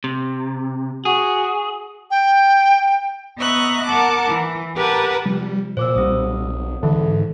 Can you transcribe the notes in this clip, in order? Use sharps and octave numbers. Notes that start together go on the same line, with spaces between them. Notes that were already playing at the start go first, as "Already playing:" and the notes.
C3
F#4 G#4
G5
B3 D#5 E5 A#5 C#6 F#6
A#4 F#5 A5 D6
E3
G4 A#4 B4 F#5 A5
C3 F3 G3
A#2 C5 D6 E6
B1 A#2 G3 C4 D#6
G#2 D3 E3 A4